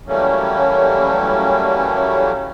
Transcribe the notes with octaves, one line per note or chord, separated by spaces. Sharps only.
E3 F#3 G3 A3 A#3 C#4